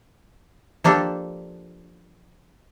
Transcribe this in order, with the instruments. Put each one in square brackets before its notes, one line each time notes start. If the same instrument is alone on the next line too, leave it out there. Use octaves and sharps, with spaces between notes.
[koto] F3 A#3 D4 G4 A4